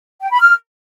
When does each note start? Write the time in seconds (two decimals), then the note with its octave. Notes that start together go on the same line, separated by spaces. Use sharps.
0.21 G5
0.31 B5
0.40 F6